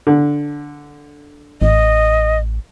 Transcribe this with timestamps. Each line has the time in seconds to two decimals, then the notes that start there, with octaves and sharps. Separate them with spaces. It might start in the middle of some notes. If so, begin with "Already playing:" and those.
0.07 D3
1.61 A1 D#5